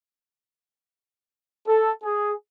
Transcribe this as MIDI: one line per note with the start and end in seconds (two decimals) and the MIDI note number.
1.68 1.91 69
2.03 2.32 68